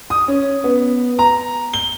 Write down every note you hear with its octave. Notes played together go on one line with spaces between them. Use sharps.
D#6
C#4
B3
A#5
G7